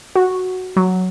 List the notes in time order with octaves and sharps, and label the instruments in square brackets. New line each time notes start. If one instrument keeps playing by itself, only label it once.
[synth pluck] F#4
F#3